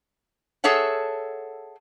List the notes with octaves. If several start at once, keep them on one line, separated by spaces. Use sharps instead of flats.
G#4 A4 C#5 E5 F#5